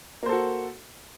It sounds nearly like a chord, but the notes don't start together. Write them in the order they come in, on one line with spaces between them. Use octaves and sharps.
A#3 C5 A4 F#4